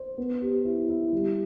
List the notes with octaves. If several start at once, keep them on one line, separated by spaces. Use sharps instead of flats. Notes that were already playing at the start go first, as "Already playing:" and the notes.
Already playing: C5
B3
G4
E4
E4
G3